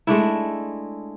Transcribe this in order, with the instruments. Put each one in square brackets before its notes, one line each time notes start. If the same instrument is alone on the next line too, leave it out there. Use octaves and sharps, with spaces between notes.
[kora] G#3 A3 D4 E4